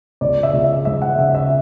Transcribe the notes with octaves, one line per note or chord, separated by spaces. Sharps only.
C#2 D5
E5
C#2
E5
G#3 E5
F#5
C#3 E5
E5